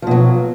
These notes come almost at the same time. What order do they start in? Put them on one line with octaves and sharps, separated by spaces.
F3 B2 F#3